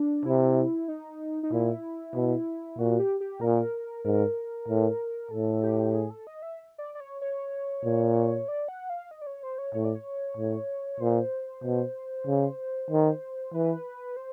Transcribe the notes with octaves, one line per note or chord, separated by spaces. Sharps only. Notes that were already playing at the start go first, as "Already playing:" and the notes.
Already playing: D4
C3 E4
D#4
D#4
A#2 E4
B2
A#2 F#4
G4
G4
A#2 A#4
G#2 A#4
A2
A2 A4
G4
G#4
A4
D#5
E5
D5
D5
C#5
C#5
A#2
D5
F#5
F5
D#5
D5
C#5
C5
C#5
A2 C#5
D5
C#5
A2
A#2 C5
B2
C#3
D#3
E3 B4
C5